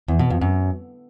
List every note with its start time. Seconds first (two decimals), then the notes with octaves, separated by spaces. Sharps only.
0.08 E2
0.19 B2
0.30 F2
0.41 F#2